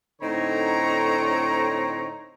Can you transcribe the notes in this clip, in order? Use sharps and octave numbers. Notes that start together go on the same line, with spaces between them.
A2 D3 C4 D#4 C#5 A#5